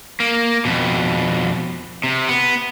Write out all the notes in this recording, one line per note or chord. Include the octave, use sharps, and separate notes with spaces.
A#3
F2 B2
C3
B3